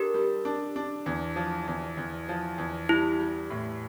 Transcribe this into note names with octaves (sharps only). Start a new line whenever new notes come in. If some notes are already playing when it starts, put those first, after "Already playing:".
Already playing: D4 G4 A4 A#4
G3
D4
D4
E2
F3
E2
E2
F3
E2
G3 E4
G3
A2